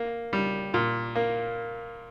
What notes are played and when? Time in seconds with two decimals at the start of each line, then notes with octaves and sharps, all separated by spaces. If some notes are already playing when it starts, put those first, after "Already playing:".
Already playing: A#3
0.33 G3
0.74 A#2
1.15 A#3